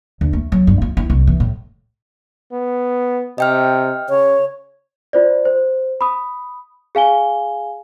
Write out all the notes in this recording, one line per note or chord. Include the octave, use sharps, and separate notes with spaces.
D2
A3
F#3
G2
F4
E4
C2
E3
A2
B3
C3 D#5 G5 F6
C#3 C#5
F4 C5 D5
C5
B5 D#6
G#4 F5 G#5 G7